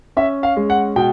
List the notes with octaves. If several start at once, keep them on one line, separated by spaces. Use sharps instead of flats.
C#4 E5
F5
G#3
F#5
B2 G5